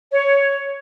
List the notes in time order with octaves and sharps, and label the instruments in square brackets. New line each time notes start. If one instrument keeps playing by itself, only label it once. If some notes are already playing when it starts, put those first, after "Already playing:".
[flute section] C#5